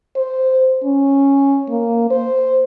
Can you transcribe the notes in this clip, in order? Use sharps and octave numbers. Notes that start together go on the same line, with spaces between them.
C5
C#4
A#3
C5